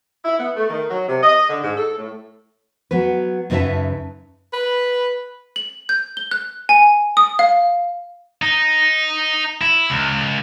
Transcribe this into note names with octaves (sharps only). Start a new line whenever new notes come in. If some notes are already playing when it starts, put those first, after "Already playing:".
E4
B3
A3
D#3
F#3
C3
D#5
D3
G#2
A4
A2
F#3 B3 B4
F#2 C#3 D#4 B4 E5 A5
B4
F#7
G6
G7
F#6
G#5
D#6
F5
D#4
E4
C#2